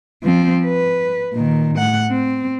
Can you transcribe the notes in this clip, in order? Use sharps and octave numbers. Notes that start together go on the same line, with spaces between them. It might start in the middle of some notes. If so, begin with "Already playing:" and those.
F3 C4
B4
A#2 D#3
A2 F#5
C4